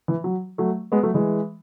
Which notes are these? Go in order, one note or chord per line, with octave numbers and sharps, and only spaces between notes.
E3
F#3
F#3 A3
G#3 B3
F#3 A3
E3 G#3